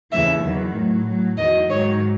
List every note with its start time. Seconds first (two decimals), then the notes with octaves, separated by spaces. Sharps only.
0.12 D#2 C#3 E3 E5
0.43 E2 D#3 F#3
0.75 A2 F#3
1.06 A2 F#3
1.38 E2 D#3 F#3 D#5
1.70 G#2 D#3 F#3 C#5